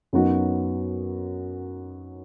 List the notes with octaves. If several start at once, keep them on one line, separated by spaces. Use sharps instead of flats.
F#2 F#3 B3 D#4 F#4